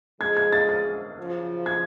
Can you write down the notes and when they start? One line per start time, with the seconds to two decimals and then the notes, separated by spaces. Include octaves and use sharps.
0.20 C#3 F3 G#3 G#6
0.37 G#6
0.52 A6
0.69 A6
1.17 F#2 C#3 F3
1.66 G#6